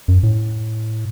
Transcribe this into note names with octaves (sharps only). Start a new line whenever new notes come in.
F#2
A2